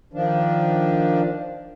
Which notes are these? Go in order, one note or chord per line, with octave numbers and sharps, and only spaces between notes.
D#3 F3 D4